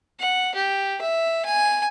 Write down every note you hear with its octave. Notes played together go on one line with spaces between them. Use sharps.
F#5
G4
E5
G#5